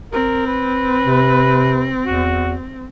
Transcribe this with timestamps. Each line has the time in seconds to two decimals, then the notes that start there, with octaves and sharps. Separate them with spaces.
0.13 C4 A#4
0.47 B4
1.07 C3
2.05 E2 F#4